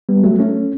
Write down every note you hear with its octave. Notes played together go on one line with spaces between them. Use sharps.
G3 B3
F#3 A3
A3 C#4